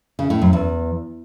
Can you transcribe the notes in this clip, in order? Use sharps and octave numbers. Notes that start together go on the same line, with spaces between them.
C#3
A2
F#2
E2